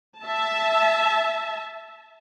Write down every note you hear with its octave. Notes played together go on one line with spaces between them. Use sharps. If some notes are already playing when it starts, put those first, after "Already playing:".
E5 A5